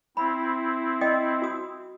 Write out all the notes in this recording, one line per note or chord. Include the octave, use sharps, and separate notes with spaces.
C4 E4 B5
D#5 G5 D#6
F#4 D#6